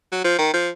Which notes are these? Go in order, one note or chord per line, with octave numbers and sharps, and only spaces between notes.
F#3
F3
D#3
F3